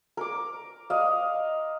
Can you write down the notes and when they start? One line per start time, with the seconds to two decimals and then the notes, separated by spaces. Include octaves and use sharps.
0.17 A#4 D6
0.90 D#5 F5